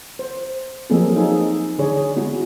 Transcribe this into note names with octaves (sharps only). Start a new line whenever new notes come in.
C5
F3 F#3 A#3 C4 G#4 A4
D#4 G#4 A4
D3 D4 G#4 C#5
G#3 B3 E4 F#4 G#4